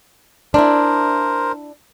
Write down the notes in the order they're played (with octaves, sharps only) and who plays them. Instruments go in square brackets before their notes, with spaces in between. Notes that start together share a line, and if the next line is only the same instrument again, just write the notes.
[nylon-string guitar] D4 E4 [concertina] A#4 C5